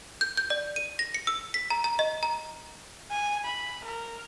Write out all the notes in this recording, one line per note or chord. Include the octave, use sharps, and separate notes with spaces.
G6
G6
D5
D#7
A#6
C#7
E6
B6
A#5
A#5
D#5
A#5
G#5
B5
A#4